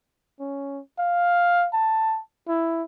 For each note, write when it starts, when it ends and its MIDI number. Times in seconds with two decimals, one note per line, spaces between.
0.40 0.80 61
0.99 1.68 77
1.73 2.20 81
2.48 2.83 64